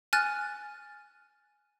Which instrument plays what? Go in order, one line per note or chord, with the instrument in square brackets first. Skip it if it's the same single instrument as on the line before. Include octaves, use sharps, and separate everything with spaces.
[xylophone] G#5 F6 F#6 A6